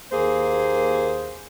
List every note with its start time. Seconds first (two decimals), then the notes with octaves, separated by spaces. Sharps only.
0.12 D#2 A#3 G#4 C5